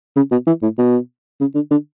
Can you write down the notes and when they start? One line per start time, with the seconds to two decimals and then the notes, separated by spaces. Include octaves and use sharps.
0.16 C#3
0.31 B2
0.47 E3
0.62 A2
0.78 B2
1.40 C#3
1.55 D3
1.71 D3